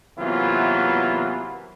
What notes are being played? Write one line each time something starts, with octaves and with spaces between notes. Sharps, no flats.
C3 E3 F#3 A#3 B3 F4